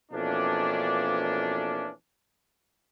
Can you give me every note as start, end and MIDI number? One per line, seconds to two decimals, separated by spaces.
0.12 1.90 41
0.12 1.90 47
0.12 1.90 52
0.12 1.90 58
0.12 1.90 61
0.12 1.90 62